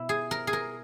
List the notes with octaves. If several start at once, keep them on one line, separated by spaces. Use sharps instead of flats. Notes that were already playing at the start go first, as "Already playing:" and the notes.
Already playing: B2 E4
G#4
A#4
G#4
A#4